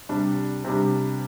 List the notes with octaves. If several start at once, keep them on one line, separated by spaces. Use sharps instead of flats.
C3 G3 D4
C3 G3 D4